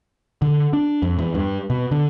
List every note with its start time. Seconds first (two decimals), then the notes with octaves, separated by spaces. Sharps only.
0.42 D3
0.73 D4
1.02 F2
1.19 E2
1.35 G2
1.70 B2
1.91 D3